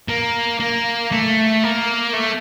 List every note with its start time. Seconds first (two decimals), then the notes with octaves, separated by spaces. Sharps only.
0.09 A#3
0.60 A#3
1.12 A3
1.64 A#3
2.14 A3